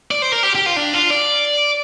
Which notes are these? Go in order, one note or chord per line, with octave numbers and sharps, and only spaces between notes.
D5
C5
A#4
G4
G4
F4
D4
F4
D5